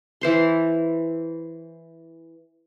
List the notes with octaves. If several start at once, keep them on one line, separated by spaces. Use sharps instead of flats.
E3 C5 C6